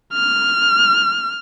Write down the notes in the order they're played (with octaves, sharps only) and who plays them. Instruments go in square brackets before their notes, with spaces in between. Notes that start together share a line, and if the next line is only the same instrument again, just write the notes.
[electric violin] F6